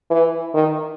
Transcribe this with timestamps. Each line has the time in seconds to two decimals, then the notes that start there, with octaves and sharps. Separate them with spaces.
0.10 E3
0.54 D#3